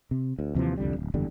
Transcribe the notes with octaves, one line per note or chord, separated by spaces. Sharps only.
C3
D2
D#2 C3 E3 F3
C2 F2 D3 G3
D1
F#1 E2 D3 G3